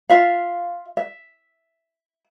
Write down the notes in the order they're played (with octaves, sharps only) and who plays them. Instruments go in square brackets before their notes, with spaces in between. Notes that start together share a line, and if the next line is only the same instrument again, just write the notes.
[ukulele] F4 E5 F5
E5